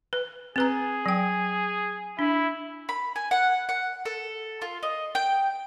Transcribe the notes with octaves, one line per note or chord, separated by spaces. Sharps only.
B4
C4 G#4 B4 A#5
F#3 G5
D4 E4
B5
G#5
F#5
F#5
A4
F4
D#5
G5